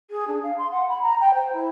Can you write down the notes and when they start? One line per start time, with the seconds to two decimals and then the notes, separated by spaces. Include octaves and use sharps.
0.10 G#4
0.27 D4
0.43 F5
0.58 C6
0.71 F#5
0.89 B5
1.02 A#5
1.20 G5
1.34 C5
1.53 E4